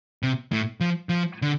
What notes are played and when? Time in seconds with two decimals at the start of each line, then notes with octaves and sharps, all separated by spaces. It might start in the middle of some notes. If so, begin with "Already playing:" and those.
0.23 C3
0.52 A2
0.81 F3
1.09 F3
1.42 D3